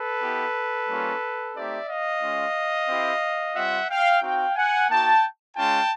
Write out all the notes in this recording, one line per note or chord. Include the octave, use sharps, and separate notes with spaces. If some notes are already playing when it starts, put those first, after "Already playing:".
Already playing: A4 B4
B3 E4 G4
G3 A#3 C#4 F4
A3 C4 D#4 G4 D5 E5
D#5 F5
G#3 C#4 F4
C4 E4 G4
G3 C4 F4 E5 F#5
F5 G5
C4 D#4 F#4 F5 G5
F#5 G#5
A#3 D#4 F#4 G5 A5
G#3 C#4 F4 G5 A5